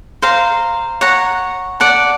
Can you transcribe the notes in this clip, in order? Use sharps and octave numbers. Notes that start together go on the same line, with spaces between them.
C5 F5 A#5
C#5 F#5 A#5
D5 F#5 A5